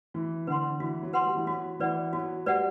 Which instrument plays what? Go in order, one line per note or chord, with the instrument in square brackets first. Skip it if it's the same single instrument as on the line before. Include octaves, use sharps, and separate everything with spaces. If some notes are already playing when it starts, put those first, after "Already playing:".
[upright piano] E3 [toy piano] F#4
[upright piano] D3 [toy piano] B4 F#5 C6
[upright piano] E3 [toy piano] F#4
[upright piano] F#3
[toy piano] B4 F#5 C6
[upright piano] G3
E3
[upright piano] F#3 [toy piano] F#4
[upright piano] E3 [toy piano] B4 D5 F#5
[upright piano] F#3 [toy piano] F#4
[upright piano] G3 [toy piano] B4 D5 F#5